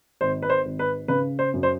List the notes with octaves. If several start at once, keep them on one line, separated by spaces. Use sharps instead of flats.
G#1 C5
B4
C5
G#1
B4
C#3 B4
C5
F#2
C5